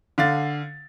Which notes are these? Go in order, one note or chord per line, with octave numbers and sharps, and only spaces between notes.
D3 F5 A6